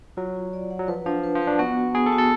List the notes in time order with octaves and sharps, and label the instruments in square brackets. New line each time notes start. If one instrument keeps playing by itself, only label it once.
[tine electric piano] F#3 [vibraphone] F4
[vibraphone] F4
D5
F#5
[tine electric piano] F#3
[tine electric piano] F3 [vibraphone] B4
[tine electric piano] F3 [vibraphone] D4
[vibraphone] B4
[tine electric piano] F3
[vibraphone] B4
[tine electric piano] D4
[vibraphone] B3 [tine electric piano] F#4
[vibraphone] F#4
[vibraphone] B3 [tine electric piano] G#4
[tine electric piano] A4
[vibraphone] F#4
[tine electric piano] A4